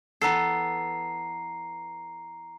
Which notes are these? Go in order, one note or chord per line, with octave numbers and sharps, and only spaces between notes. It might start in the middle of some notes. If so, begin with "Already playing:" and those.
E3 B3 A4 A#5 C7